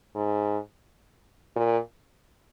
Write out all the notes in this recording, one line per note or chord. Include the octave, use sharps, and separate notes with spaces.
G#2
A#2